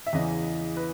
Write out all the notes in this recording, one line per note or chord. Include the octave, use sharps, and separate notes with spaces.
E5
E2 C#3 E3 D#5
B4